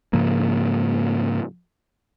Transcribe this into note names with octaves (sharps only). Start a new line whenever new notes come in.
G#2 C#3 F3 A#3